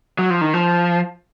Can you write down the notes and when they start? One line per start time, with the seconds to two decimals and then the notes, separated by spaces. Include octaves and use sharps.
0.19 F#3
0.30 F3
0.41 D#3
0.54 F3